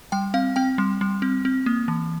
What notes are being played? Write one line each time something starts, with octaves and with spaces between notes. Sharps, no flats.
G3 G5
C4 F5
C4 G5
G3
G3
C4
C4
A#3
E3